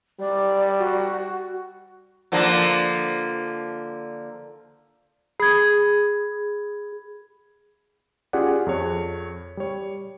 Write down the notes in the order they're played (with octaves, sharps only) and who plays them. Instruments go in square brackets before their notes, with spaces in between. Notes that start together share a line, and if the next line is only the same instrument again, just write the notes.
[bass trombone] G3 [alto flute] D5
[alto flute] F#4
[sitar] D3 F3 A#3
[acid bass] G#4 [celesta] B5 G#6
[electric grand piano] C#4 F4 G4 G#4 D5 F#5
F2 G#4 C#5
G3 C#5